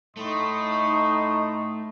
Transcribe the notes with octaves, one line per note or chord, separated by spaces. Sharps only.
A2 A3 D#4 D#5 C6 C#6